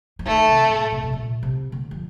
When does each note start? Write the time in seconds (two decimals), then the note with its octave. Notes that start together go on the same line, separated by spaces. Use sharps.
0.19 F3
0.26 D#3 A3
0.48 C3
0.69 A2
0.92 C3
1.03 C3
1.13 A#2
1.43 C3
1.72 D3
1.91 F3